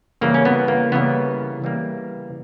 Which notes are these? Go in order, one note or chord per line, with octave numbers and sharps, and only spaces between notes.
C#3 E3 G3 A#3
C#4
B3
A#3
C#3 E3 G3 A#3 B3
C#3 E3 G3 A#3